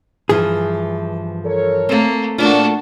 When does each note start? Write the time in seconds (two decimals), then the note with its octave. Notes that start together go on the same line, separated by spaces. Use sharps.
0.29 G2 E3 F3 G#4
1.45 A4 A#4 C#5
1.89 A3 A#3 C4
2.38 A#1 A#2 A3 A#3 D4 F4 F#4